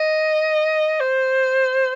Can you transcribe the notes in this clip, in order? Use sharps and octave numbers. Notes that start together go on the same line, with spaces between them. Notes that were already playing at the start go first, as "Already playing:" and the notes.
Already playing: D#5
C5